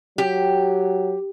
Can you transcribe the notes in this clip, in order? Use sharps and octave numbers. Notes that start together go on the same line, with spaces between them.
F#3 G4